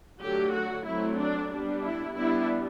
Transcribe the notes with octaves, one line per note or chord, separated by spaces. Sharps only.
D3 F#3 A3 G4
F#4
F#3 A3 C4 E4
D4
G3 B3 D4
E4
G3 B3 D4 E4